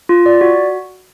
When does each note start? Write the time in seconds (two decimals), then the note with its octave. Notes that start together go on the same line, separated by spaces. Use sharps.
0.09 F4
0.26 D5
0.41 F#4